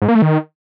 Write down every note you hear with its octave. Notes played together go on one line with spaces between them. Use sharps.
G#2
A#3
A3
D#3